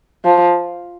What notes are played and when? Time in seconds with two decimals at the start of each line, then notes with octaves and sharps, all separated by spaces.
0.25 F3